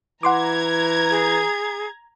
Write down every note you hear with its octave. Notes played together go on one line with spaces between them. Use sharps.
E3 F#5 A#5 C6 D6 G#6
G#4